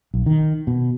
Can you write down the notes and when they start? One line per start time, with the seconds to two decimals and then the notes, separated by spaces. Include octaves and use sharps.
0.14 B1
0.26 D#3
0.67 B2